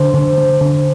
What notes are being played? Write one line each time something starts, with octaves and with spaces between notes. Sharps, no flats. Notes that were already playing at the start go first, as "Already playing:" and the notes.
Already playing: D3 C5
D3
D3
D3